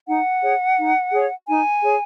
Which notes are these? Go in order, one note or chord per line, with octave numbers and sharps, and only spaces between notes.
D#4 F#5
G#4 C#5
D#4
G#4 C#5
D#4 G#5
G#4 C#5